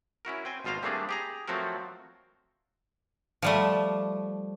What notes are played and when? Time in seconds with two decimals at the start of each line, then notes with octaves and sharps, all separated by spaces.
0.25 C#4 E4 F#4 A#4
0.45 C4 G5 G#5
0.64 G#1 B2 F4 C5 F5 A#5
0.83 G3 A3 A#3 C4 D4 G#4
1.09 G4 G#4 A#5
1.48 F3 F#3 A3 C4 F#4 A#4
3.42 F3 G3 A3